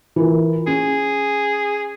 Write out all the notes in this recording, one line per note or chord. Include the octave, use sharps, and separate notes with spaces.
E3 F4 A#4
C#4 G#4